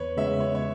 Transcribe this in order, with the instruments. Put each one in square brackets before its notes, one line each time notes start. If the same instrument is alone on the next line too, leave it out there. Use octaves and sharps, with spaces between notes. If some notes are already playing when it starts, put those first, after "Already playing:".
Already playing: [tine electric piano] E2 [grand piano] B4 C#5
[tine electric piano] C#3 G#3 B3 [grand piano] E5
[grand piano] C#5
C#5